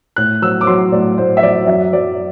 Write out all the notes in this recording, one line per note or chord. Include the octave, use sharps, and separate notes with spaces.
A2 F#6
F#3 E6
D6
F#3 C6
A2 D5
A2 C5
E5
F#3 D5
F#2 E5
F#3 D5